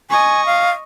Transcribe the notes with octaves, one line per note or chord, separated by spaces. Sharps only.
D#5 G#5 C#6
F5